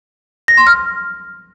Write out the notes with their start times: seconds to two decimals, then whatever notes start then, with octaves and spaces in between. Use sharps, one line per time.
0.48 A#6
0.57 C6
0.67 F6